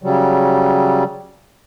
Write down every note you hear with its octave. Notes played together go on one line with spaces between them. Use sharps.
C#3 F#3 G3